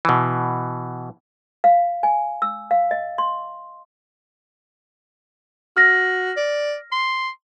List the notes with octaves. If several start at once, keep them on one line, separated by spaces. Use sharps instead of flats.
B2 E3
F5
G#5
E6
F5
D#5
C6
F#4 F6 A#6
D5
C6